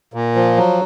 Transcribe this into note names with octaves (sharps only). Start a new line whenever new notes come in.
A#2
F3
F#3